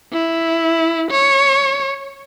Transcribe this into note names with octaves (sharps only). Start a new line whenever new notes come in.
E4
C#5